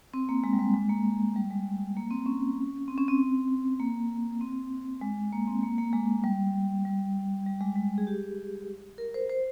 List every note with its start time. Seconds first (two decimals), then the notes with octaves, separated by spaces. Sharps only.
0.14 C4
0.29 A#3
0.44 G#3
0.53 G3
0.59 G#3
0.74 G#3
0.89 A#3
1.36 G3
1.50 G#3
1.97 A#3
2.11 C4
2.26 C#4
2.88 C4
2.98 C#4
3.08 C4
3.80 A#3
4.41 C4
5.02 G#3
5.32 A#3
5.48 C4
5.63 A#3
5.78 A#3
5.93 G#3
6.24 G3
6.85 G3
7.46 G3
7.61 G#3
7.76 G#3
7.98 G#4
8.07 G4
8.98 A#4
9.14 C5
9.30 C5